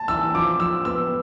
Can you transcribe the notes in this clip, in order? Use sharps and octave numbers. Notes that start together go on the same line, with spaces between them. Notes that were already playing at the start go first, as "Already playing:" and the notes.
Already playing: A5
E3 E6
F3 D6
F3 E6
B3 E6